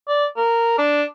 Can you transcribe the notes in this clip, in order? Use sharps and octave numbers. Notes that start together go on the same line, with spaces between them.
D5
A#4
D4